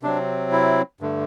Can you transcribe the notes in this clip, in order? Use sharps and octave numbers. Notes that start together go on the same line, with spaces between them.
C3 F#3 C4 D4
E4
G2 D3 A3